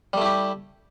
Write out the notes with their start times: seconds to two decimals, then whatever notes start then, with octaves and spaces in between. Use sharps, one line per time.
0.13 G3
0.17 A3
0.21 E4
0.25 G4